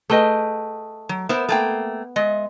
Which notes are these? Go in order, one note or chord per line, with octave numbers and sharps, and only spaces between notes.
A3 G#4 B4 D#5 G5
F#3
B3 A#4 C5 E5
A3 A#3 G5
G#3 D#5 E5